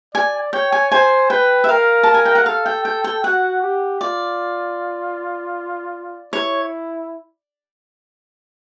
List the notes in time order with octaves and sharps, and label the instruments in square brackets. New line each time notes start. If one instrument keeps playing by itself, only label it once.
[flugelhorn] D5 [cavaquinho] G#5
[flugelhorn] C#5 [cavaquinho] G5
[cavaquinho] G#5
[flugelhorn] C5 [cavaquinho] G#5
[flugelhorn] B4 [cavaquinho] G5
[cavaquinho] E5
[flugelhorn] A#4 [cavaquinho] F5
[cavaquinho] A5
G#5
G5
F#5
[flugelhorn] A4 [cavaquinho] F5
[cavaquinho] G5
G5
G5
[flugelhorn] F#4 [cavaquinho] F#5
[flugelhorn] G4
[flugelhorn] F4 [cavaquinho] D5
[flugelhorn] E4 [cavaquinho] C#5